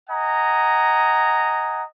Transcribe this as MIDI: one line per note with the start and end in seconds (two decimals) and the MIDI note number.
0.10 1.84 75
0.10 1.84 78
0.10 1.84 80
0.10 1.84 82